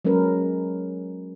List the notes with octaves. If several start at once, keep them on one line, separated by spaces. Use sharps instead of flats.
F#3 G#3 C#4 A#4 B4